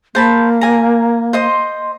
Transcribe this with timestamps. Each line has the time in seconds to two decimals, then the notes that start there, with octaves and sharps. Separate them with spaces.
0.15 A#3 C5 A5 B5
0.61 G#5 A#5
1.33 C5 D#5 C6